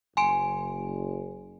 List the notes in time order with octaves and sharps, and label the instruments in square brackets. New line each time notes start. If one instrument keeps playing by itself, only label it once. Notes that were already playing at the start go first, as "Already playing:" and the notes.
[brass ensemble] F#1 [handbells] G#5 C6 D7